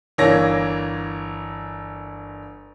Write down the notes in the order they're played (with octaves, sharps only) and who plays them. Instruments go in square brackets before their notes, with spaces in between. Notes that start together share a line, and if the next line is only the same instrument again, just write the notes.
[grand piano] G1 E3 A#3 C#5 A#6